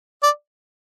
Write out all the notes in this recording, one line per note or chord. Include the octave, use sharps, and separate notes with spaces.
D5